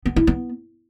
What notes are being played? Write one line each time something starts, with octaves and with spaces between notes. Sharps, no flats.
B3
E4
B3